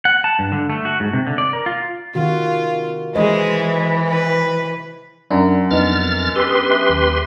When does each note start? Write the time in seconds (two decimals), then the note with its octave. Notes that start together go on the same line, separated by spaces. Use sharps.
0.05 F#5
0.24 A5
0.39 G2
0.52 D3
0.70 A3
0.85 F#4
1.00 G#2
1.13 C3
1.27 D3
1.38 D5
1.53 A#4
1.66 F4
2.15 C3 D#3 F4 F#4
3.15 E3 G#3 C5 D#5
4.09 B4
5.31 F#2 D4 E5 F#5 A#5
5.71 F2 B3 D4 D#4 F6 A6
6.36 G4 B4 C6 E6
6.50 D#6
6.70 E5 F#6
6.90 D#2